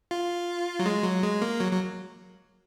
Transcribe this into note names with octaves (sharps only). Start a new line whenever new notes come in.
F4
F#3
G#3
F#3
G#3
A#3
F#3
F#3